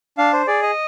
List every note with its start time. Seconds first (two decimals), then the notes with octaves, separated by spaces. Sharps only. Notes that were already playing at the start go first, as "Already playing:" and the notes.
0.18 D4 F5
0.33 C5
0.47 G#4 D5
0.62 D#5